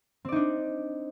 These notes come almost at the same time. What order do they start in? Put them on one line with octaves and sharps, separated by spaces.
C4 D5 D#4 D4